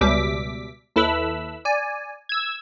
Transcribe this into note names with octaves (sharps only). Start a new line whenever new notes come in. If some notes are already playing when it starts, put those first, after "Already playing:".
C#2 B2 G3 E5 D6 B6
D#2 E4 A4 B4 B5 E6
D5 G#5
E6 G#6